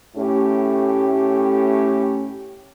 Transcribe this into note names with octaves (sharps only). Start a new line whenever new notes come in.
A2 A3 C#4 G4